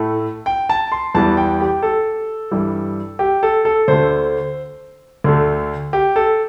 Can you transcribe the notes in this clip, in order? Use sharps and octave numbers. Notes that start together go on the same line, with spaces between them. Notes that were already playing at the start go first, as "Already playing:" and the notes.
Already playing: A2 A3
G5
A5
C6
E2 E3 G3 A5
G5
G4
A4
G2 E3 G3
G4
A4
A4
D2 D3 A3 C5
D2 D3 A3
G4
A4